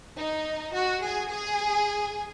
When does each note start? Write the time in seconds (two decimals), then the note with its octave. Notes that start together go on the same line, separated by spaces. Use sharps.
0.18 D#4
0.73 F#4
1.03 G#4
1.31 G#4